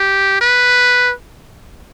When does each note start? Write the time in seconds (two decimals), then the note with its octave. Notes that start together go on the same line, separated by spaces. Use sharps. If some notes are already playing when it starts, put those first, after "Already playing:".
Already playing: G4
0.41 B4